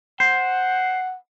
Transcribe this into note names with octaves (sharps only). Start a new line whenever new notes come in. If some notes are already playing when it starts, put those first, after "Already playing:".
C5 F#5